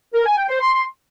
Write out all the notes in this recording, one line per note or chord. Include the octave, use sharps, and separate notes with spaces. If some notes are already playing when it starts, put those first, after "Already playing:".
A#4
G#5
G5
C5
C6